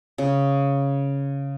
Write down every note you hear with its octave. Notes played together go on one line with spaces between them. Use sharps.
C#3